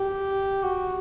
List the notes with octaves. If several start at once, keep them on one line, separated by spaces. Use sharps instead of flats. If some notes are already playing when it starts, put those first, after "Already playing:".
Already playing: G4
F#4